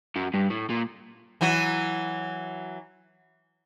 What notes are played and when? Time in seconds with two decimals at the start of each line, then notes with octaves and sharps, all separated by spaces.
0.16 F#2
0.34 G2
0.50 A2
0.70 A#2
1.41 E3 F#3 F#4